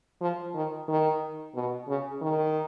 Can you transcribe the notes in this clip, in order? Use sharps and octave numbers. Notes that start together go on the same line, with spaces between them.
F3
D#3
D#3
B2
C#3
D#3